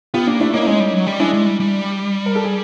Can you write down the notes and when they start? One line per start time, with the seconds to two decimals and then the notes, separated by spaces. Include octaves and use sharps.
0.14 B3 F4 G4
0.27 A#3 D4
0.40 A3 D4 E4
0.53 A#3 C#4 D#4
0.61 E4
0.67 G#3 C#4 D#4
0.80 G3
0.93 F#3
1.07 G3
1.20 G#3 D4 E4
1.34 G#3
1.46 G3
1.60 G3
2.26 A#4
2.35 A4
2.44 G#4